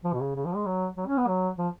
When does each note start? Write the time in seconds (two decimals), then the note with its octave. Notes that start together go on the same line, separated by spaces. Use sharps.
0.04 F3
0.14 B2
0.20 C#3
0.35 C#3
0.46 F3
0.56 G#3
0.66 F#3
0.97 F#3
1.07 C#4
1.18 B3
1.28 F#3
1.58 F3